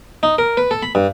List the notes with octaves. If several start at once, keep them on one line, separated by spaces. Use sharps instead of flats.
D#4
A#4
B4
A4
B5
G2